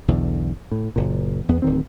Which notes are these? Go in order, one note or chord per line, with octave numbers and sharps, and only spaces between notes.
B1 E2 D3
A2
F#1 A#2
E2 B3
D1 D#3 C4